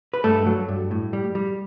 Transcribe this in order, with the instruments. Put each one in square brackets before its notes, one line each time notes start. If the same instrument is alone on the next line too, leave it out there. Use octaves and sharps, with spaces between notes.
[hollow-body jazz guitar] B4
G2 A3 A4
F#3
G2
A2
G3
G3